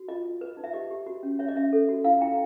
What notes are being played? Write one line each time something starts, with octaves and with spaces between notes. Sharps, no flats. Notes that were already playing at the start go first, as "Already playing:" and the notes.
Already playing: F#4
F4 D#5
F4
B4
D#4
E5
G4 D#5
G4
F#4
C#4
C#5 E5
D#5
C#4 E5
A4
F#4
E4 F5
E4 G5